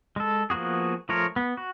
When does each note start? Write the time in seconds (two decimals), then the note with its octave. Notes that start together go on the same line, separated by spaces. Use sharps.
0.16 G#3 A4
0.50 F3 A#3 B3 F#4 G#4
1.09 F3 A3 F4 A#4 C#5
1.36 B3
1.57 F#4